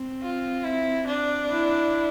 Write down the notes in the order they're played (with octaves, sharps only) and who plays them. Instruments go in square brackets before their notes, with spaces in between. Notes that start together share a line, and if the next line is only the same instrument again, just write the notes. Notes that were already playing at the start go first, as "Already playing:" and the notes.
Already playing: [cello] C4
[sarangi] F4
E4
D4
[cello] E4